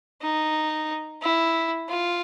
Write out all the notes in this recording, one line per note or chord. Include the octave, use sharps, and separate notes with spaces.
D#4
E4
F4